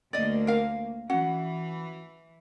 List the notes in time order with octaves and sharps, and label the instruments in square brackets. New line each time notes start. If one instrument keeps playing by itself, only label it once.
[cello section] D2 A#3 [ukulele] D5 D#5
[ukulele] A#4 F5
[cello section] E3 [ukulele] C#4 F#4 F#5